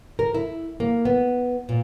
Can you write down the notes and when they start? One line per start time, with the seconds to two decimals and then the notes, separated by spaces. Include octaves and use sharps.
0.19 A#4
0.34 E4
0.80 A#3
1.05 B3
1.69 A#2